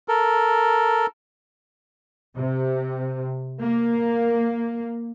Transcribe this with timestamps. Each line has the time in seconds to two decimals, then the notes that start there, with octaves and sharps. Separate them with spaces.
0.08 A4 A#4
2.36 C3
3.62 A#3